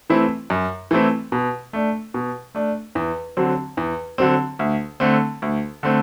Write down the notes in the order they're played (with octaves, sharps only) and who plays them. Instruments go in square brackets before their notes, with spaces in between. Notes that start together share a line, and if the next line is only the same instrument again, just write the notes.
[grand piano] E3 A3 C4 E4
F#2
E3 A3 C4 E4
B2
A3 D4
B2
A3 D4
E2
D3 F#3 C4
E2
D3 F#3 C4
D2
D3 A3 C4
D2
D3 A3 C4